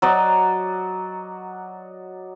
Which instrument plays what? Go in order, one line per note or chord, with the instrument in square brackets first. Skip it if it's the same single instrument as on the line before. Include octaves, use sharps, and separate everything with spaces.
[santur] F#3 F#4 D5 D#5